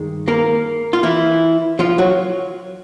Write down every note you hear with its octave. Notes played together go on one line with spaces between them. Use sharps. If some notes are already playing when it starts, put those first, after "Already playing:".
Already playing: G2 D#3 G#3
A#3 A#4
F4
E3 E4
F3 F4
F#3 F#4